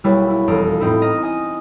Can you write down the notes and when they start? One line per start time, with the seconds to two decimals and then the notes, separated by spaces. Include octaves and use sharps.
0.04 B1 G3 A#3 E4 B4 C#5
0.30 E4
0.48 E1 F2 A4 A#5 D7
0.80 A2 C4 D#4 E4
1.02 D#5 A#5 F6 A#6
1.21 D#5 G#5 A#5